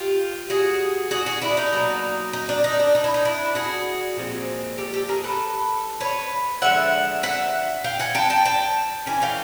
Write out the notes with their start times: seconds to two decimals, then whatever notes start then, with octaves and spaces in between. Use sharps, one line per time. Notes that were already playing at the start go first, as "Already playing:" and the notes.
Already playing: F4 G4
0.50 F#4 G#4
1.11 F#4 G#4
1.26 F#4 G#4
1.42 D4 E4
1.57 D#4
1.72 B2 F#3 A#3
2.33 D#4
2.49 D4
2.64 D#4
2.80 D4
2.95 D#4
3.04 E4
3.14 D#4
3.25 D4 E4
3.55 F#4 G#4
4.16 A#2 F3 G#3 C4
4.78 G4 A4
4.94 G4 A4
5.09 G#4 A#4
5.24 A4 B4
6.00 B4 C#5
6.62 D3 F3 G#3 E5 F#5
7.23 E5 F#5
7.84 F5 G5
7.99 F#5 G#5
8.15 G5 A5
8.30 G5 A5
8.45 G5 A5
9.06 E3 A3 C#4 G#5
9.22 F5 G5